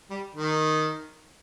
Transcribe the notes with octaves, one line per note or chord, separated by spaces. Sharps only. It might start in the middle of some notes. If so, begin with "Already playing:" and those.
G3
D#3